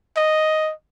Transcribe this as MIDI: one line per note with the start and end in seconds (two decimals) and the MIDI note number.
0.16 0.72 75